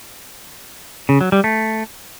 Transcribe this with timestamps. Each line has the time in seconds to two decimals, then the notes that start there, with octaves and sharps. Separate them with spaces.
1.09 C#3
1.21 F#3
1.32 G3
1.44 A3